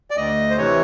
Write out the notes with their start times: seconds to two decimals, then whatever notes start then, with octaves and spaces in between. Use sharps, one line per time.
0.11 D5
0.16 D2 D#5
0.50 C5
0.57 C3 E3 C#5